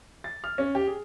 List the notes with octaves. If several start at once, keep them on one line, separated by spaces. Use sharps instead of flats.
A6
F6
C#4
G4
G#4